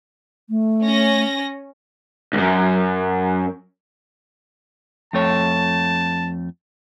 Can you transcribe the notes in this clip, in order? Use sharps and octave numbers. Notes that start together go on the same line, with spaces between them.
A3
C#4 A#6
C#2 F#2
F2 A3 C#5 A5